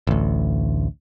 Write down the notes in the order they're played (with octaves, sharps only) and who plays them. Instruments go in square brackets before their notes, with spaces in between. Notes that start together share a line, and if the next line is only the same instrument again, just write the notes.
[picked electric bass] A1 D2